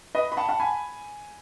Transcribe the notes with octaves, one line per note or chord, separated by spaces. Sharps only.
B4 D#5
B5
F#5 A5
F#5 A5
G#5 B5